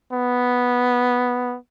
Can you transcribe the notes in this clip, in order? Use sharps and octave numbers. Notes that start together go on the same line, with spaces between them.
B3